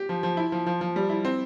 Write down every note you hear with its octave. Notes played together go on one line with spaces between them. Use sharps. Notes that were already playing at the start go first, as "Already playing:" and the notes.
Already playing: G4
F3
F3
E4
F3
F3
F3
G3
E4
C4